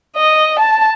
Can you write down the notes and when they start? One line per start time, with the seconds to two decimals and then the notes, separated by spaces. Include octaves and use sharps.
0.16 D#5
0.59 A5